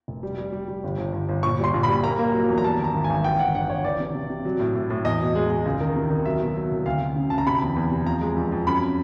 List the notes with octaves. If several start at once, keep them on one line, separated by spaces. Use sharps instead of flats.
F1
G3
G3
G3
G3
G1
G1
G1
G1
A#1 C#6
G3 C6
A#1
G3 B5
A#3 A#5
A#3
F#3
E2
A#5
G3 A5
D#3
A#5
G#1
G#5
G#1
E3 G5
G1 F#5
G2 F#5
G1 C#5
E3 D5
C3
C3
C3
F#3
A2
A2
A2
E2 D#5
B2
G#3
G#3
C#2
D#3
C3
D#3
F#3 E5
B2
F#3
C2
D2 F5
D2
C#3
D2 A5
A#5
C3 B5
E2
E2
C3
F3 A#5
G#3
F2
F2
F#2 B5